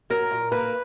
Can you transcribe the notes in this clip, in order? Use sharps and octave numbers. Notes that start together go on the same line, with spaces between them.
F#3 A#4
A#2
A#3 B4